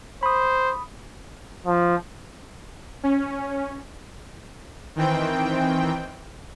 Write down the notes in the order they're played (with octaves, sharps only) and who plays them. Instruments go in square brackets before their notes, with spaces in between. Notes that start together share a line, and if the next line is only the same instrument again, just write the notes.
[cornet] C5 [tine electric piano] B5 D#6
[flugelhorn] F3
[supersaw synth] C#4
D#3 E3 C4 G5